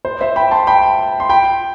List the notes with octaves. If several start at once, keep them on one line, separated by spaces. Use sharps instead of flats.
C5
C5 E5
G5 B5
A5 C6
G5 B5
C6
G5 B5